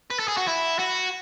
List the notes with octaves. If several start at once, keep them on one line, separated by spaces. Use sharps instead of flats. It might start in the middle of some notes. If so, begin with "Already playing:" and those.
B4
A4
G#4
F#4
E4
F#4